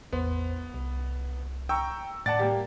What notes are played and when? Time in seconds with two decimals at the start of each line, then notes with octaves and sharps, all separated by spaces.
0.12 A1 E2 B3 C5
0.74 C2
1.69 G5 A#5 C#6 E6
2.26 A2 D5 F#5 A5 A6
2.39 G3 A#3 G4